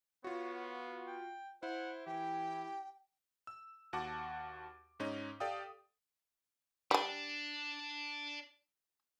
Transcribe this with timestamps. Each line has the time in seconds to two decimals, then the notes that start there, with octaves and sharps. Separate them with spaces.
0.24 B3 F4 F#4 C#5
1.07 G5
1.63 E4 C5 F#5
2.07 E3 G4 G5
3.47 E6
3.93 D#2 F#4 F#5 A5 D6
5.00 G#2 C#4 D#4
5.40 G4 A4 D5 F5 G5 D#6
6.91 G3 D4 G#5